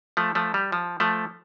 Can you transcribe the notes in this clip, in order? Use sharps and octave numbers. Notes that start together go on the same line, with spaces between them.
F3 A3
F3 A3
G3
F3
F3 A3